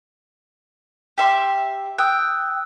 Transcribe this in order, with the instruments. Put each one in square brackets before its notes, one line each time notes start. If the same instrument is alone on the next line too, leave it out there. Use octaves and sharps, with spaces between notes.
[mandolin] G4 E5 C6
[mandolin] G5 [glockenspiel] D#6 E6 F#6